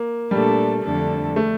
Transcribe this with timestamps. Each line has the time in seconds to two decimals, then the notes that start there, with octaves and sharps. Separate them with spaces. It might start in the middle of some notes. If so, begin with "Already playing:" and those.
Already playing: A#3
0.31 A#2 G3 A3 D4 A4
0.83 F2 D3 A3 D4 A4
1.36 A3